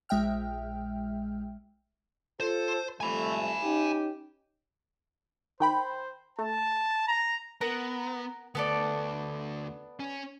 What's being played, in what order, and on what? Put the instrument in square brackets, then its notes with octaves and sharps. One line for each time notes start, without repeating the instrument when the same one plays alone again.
[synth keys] A#1 G#3 E5 G5 F6
[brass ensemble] F4 A4 [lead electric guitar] C5
[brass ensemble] F2 G3 A3 [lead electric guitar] G#5 B5
[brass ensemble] C#4 D#4 G4
[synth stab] D#3 G5 B5 [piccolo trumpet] C5
[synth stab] A3 [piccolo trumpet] A5
[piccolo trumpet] A#5
[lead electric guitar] B3 [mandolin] A#4 F#5 A#5
[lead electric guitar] D2 [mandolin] B3 A4 D5
[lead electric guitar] C#4